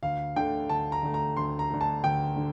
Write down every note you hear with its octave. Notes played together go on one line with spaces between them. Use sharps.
D2 F5
D3 A3 G5
D2 A5
A#5
D3 A3
A#5
D2 C6
A#5
D3 A3
A5
D2 G5
D3